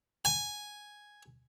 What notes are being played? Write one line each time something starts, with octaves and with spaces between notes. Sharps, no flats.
G#5